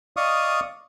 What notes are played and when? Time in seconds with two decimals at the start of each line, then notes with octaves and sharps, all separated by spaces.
0.17 D5 D#5 F5 C#6 D#6